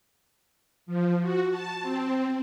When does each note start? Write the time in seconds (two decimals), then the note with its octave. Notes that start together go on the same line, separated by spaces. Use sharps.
0.86 F3
1.20 F#4
1.50 A5
1.81 C4